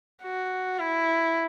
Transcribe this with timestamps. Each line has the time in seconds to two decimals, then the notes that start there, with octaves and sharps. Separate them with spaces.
0.23 F#4
0.79 E4